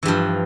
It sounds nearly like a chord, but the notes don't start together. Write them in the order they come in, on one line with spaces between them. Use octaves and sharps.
E3 G2 F3